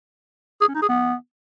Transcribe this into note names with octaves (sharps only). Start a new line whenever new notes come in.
G#4
C#4
D#4
G#4
B3